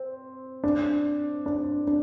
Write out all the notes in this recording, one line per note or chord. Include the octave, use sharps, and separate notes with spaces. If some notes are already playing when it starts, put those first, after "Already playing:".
Already playing: C4
D4
D4
D4